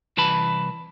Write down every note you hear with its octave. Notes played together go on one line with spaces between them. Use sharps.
C2 E3 B4 A5 B5